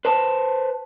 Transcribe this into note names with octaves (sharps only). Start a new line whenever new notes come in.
B4 C5 A5